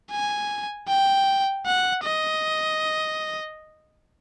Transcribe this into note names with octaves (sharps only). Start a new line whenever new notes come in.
G#5
G5
F#5
D#5